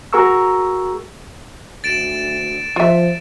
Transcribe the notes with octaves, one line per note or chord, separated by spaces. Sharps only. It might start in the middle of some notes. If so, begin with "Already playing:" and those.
F#4 G#4 A#4 A#5 C#6 E6
D2 A6 D7 E7
F3 F4 E5